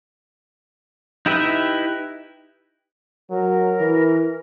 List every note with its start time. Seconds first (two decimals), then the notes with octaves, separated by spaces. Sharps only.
1.26 D#4 E4 G4 B4 E5
3.30 F#3 A#4
3.80 E3